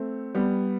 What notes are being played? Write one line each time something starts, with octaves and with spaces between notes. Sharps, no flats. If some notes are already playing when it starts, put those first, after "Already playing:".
Already playing: A3 C4
G3 B3